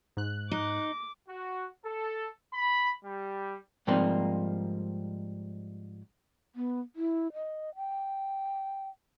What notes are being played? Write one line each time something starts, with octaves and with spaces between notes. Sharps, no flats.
G#2 F#6
D#4 D6
F#4
A4
B5
G3
G#2 F3 G3 A#3 C4 D#4
B3
E4
D#5
G5